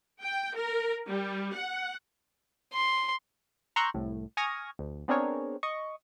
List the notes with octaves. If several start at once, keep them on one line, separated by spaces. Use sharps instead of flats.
G5
A#4
G3
F#5
C6
A#5 C6 C#6 E6 F#6 G6
C2 A2
G#5 C#6 D#6 F6 G#6 A#6
D2
B3 C4 D4 G#4 A#4 C#5
D#5 C#6